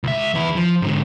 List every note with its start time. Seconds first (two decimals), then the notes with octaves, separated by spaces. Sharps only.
0.04 C#2 E5
0.34 E2 E4
0.56 F3
0.82 G#2 D3